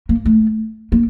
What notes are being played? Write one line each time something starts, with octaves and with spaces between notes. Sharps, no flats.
A#3
A3
A#3